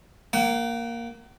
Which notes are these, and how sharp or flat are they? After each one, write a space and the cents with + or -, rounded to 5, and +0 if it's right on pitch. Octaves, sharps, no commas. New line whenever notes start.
A#3 +0 F#5 +40